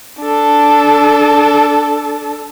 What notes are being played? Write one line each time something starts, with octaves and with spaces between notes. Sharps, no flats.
D4 A4